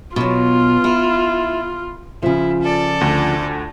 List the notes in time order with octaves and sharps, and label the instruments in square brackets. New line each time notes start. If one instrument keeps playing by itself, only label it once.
[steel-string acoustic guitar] B2 F#3 [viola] F4
[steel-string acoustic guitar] E4
[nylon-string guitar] C#3 F3 [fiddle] E4 [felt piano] F4
[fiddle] A4 D5
[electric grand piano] D2 D3